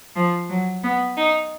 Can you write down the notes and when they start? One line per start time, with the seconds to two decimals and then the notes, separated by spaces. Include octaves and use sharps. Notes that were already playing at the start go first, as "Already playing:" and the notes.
0.16 F3
0.49 F#3
0.83 B3
1.16 D#4